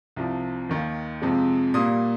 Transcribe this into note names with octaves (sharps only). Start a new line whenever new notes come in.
C2 C3 F3
D#2 D#3 A#3
F2 C3 F3 G#3
A#2 G3 A#3 D#6